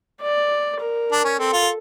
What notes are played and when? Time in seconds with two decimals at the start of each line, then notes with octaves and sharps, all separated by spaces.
0.21 D5
0.80 A#4
1.12 D4
1.25 C#4
1.39 C4 A4
1.53 F4